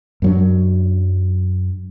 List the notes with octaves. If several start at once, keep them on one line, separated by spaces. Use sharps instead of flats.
F#2 F#3 D4